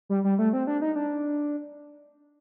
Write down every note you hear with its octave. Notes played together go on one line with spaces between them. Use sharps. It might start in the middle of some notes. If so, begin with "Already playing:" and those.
G3
G3
A3
C4
D4
D#4
D4